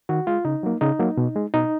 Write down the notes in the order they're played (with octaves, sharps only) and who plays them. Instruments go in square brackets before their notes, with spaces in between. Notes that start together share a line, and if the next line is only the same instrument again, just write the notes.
[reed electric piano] D#3 F#4
G#3 F4
C#3 D#4
F#3 A#3
C#3 D#4
F#3 A#3
B2
G#3
B2 D#4